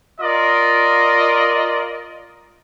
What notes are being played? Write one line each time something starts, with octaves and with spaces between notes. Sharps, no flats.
F4 A#4 D5 D#5